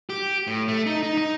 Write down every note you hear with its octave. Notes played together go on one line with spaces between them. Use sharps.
G4
A2
A3
D#4
D#4
D#4